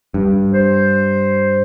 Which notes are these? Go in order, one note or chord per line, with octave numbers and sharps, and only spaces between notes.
G2
C5